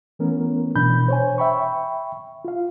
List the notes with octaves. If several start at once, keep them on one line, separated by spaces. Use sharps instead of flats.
E3 A3 B3 C#4 A#4
B2 E3 D4 B5 G6
C5 C#5 G#5
E5 G5 B5 C#6
F4 F5